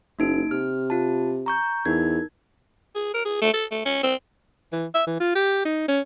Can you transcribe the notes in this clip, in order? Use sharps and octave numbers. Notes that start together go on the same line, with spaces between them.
F#1 A#3 D#4 D7
C3 F6
F4 A5
A#5 C#6 G6
E2 D#4 A#4 G#6
G#4
A#4
G#4
A3
A4
A3
C#4
C4
E3
E5
E3
F4
G4
D#4
C#4